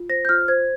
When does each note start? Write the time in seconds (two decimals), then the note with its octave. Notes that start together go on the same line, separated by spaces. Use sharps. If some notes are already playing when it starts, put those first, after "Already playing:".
Already playing: F4
0.09 C5 A#6
0.25 G6
0.29 F4 F6
0.48 C5 G#6